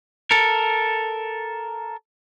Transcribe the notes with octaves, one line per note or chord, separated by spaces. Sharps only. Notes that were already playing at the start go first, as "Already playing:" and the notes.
A4 A#4